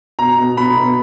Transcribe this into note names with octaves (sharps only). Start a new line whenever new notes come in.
B2 A#5
B2
B2 B5
B2